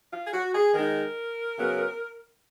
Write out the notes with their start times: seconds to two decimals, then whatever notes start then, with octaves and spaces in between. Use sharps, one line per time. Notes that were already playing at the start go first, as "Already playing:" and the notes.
0.13 F4
0.25 G#4
0.33 F#4
0.54 G#4
0.74 D#3 G#3 D#4 A#4
1.56 C#3 F#3 B3